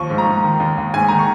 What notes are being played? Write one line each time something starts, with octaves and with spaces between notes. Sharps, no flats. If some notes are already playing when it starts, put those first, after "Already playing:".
Already playing: D#2 F3 C#6
G#2
A#5
G#2
D#3
D#2
D#2
G#2 G#5
D#3 A#5
C#6